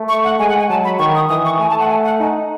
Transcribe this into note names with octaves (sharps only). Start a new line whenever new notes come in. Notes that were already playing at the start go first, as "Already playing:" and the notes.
Already playing: A3
C#6
F#5
G#3 G#5
F#5
G#5
F#3 A5
B5
D#3 C#6
D#6
E3 D#6
C#6
A3 G#5
A5
F#5
G#5
F#5
D#4 G#5